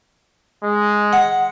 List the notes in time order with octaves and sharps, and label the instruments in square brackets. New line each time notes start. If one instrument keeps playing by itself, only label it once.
[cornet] G#3
[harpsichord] F#5